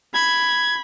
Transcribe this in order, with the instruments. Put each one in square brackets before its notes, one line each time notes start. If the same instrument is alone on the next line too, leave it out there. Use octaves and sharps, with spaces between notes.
[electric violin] B5 [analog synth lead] G#6